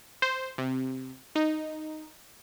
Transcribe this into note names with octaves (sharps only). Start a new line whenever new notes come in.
C5
C3
D#4